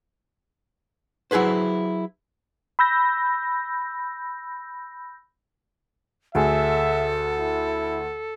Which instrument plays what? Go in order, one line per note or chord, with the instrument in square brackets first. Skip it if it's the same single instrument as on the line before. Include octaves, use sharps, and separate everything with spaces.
[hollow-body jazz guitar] F#3 E4 G#4 B4 C5
[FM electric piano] B5 E6 G6 A#6
[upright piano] D2 G#4 [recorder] A4 [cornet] E5
[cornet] E4